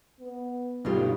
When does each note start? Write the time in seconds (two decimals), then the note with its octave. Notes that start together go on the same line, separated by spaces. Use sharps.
0.20 B3
0.85 B1 G2 B2 D3 G3 F4 G4